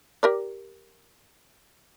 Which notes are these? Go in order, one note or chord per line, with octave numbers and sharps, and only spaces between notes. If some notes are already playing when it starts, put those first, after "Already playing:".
G4 A#4 D5